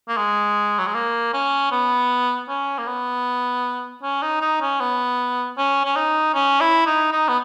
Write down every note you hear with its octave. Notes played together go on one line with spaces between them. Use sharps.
A#3
G#3
F#3
G#3
A#3
C#4
B3
C#4
A#3
B3
C#4
D#4
D#4
C#4
B3
C#4
C#4
D#4
C#4
E4
D#4
D#4
B3